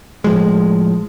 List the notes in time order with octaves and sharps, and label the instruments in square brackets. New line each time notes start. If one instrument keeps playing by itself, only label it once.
[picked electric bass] A2 F3 G#3